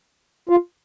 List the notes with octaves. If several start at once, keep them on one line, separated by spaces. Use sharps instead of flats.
F4